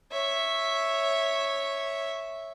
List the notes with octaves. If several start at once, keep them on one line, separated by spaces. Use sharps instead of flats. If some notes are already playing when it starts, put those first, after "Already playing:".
C#5 E5